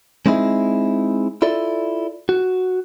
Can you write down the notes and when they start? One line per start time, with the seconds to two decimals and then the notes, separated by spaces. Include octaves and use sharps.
0.26 G#3 C4 D#4 E4 G#4
1.42 E4 F4 A4 D5
2.29 F#4